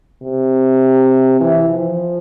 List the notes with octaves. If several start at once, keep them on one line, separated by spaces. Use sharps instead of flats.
C3
E3
F3